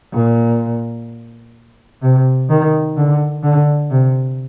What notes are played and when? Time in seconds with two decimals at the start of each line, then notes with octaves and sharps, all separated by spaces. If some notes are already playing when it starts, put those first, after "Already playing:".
0.13 A#2
2.02 C3
2.50 D#3
2.97 D3
3.43 D3
3.91 C3